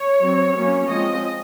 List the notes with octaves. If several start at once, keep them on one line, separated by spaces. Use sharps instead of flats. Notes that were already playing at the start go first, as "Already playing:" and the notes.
Already playing: C#5
F#3 C4
F#3 A#3 C#4
F3 G#3 C4 D#5